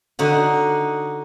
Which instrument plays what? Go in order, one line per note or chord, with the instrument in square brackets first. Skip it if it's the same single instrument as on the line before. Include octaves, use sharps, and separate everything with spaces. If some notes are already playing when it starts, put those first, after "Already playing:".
[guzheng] D3 D#4 F#4